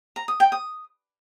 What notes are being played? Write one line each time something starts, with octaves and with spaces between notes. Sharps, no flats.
A#5
D#6
G5
D#6